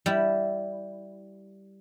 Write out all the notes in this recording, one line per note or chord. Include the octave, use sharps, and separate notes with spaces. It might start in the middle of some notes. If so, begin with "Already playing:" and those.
G3 E4